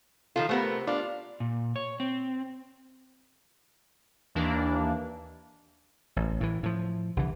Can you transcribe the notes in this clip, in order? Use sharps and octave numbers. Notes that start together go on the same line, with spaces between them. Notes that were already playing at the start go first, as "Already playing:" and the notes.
D#3 F3 F4 A4
C3 A3 B3 A#4
D4 F4
A#2
C#5
C4
D#2 E3 A#3 D4
A1
A2 E3
A2 F3
C2 D3 E3